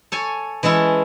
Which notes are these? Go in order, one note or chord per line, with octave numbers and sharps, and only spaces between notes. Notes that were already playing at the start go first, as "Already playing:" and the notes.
A4 C#5 G#5
E3 G#3 C#4 E4 A4